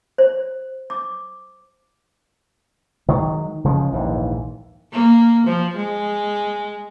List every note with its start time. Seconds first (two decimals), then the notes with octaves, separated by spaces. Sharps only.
0.18 C5
0.90 D6
3.09 D#3 F#3 G#3
3.64 C#3 F3 G#3
3.92 A#1 D#2 G#2 E3
4.92 A#3
5.47 F3
5.76 G#3